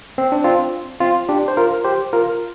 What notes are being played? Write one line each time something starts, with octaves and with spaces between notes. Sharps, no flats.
C4
D4
C4 F4
C4 F4
D4 G4
C5
F4 A#4
G4 C5
F4 A#4